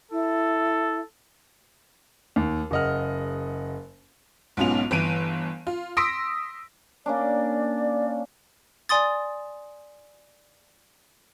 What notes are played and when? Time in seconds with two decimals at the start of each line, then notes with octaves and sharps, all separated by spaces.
0.11 E4 A4
2.36 D#2
2.71 F#1 C#3 D#5 F#5 F6
4.57 B1 G#2 B3 C#4 F4 F7
4.91 G1 E3 D7 D#7
5.67 F4
5.97 C6 D#6 E6 A#6 B6 D7
7.06 A#3 C#4 D4 D5
8.89 D5 G#5 C6 D#6 A6